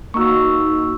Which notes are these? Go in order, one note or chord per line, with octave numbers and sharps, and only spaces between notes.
A#3 D#4 F#4 C#6 E6